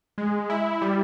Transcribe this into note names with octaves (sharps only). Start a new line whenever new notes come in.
G#3
E4
G3